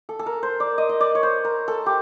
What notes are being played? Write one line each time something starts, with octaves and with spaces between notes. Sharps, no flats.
A4
A4
A#4
C5
D5
D#5
D#5
D5
C#5
C5
A#4
A4
G4